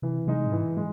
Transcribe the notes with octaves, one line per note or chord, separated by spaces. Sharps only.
C3 E3
C3 G#3 D#4
A2
G#2 E3
G#3